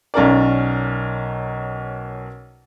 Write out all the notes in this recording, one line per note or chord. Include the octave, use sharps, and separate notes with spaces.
B1 C#4 A#4 D5